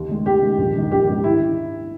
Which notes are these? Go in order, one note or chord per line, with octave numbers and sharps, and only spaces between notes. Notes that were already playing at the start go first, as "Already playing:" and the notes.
Already playing: D#2
D#3 G#3
D#2 G4
D#3 G#3
A#1
G#2 D#3
A#1 G4
G#2 D#3 G4
E4